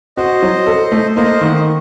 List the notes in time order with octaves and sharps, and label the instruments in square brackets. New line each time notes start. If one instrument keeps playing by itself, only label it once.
[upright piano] F#4 [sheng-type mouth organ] C5 D#5
[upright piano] F#3
A4
A3
[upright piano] A#3 [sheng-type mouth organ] C5 D#5
[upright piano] D#3 [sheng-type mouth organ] F#5
[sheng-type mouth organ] D#5